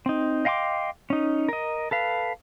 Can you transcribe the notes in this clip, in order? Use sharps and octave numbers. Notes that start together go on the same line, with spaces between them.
C4 D#4
D#5 F5 G5 C6 D6
C#4 D#4
A#4 D#5
A4 B4 F5